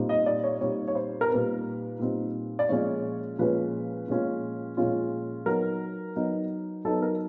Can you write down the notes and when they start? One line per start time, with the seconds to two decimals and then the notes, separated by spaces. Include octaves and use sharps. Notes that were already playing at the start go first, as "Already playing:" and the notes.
Already playing: A#2 G3 C4 D#4
0.09 D#5
0.26 D5
0.44 C#5
0.60 A#2 G3 C4 D#4 C#5
0.88 C#5
0.95 C5
1.21 A#4
1.30 A#2 G3 C4 D#4 B4
1.99 A#2 G3 C4 D#4
2.59 D5
2.69 A#2 F3 G#3 C#4 F4 C#5
3.39 A#2 F3 G#3 C#4 F4 B4
4.08 A#2 F3 G#3 C#4 F4
4.77 A#2 F3 G#3 C#4 F4
5.46 F#3 B3 D#4 A#4
6.16 F#3 B3 D#4
6.85 F#3 B3 D#4 A4
7.02 A#4